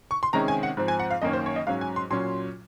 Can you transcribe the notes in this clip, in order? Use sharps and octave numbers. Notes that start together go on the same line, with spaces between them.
C#6
C6
C3 D#3 G#3 C#4 A#5
G#5
F#5
G#2 F3 C4
G#5
F#5
F5
F#2 D#3 A#3 C#4 D#5
C5
C#5
D#5
G#2 F#3 C#4 F5
G#5
C6
A#2 F#3 C#4 C6